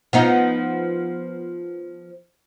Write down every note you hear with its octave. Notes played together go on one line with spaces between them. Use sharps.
F3 B3 D#4